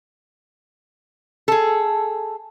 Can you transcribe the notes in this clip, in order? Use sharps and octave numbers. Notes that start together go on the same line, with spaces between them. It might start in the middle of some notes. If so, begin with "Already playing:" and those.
G#4 A4